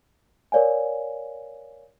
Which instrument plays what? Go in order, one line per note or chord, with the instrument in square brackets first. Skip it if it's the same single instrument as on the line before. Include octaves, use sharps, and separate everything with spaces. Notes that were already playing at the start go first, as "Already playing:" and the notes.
[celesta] A#4 C#5 D5 F5 G#5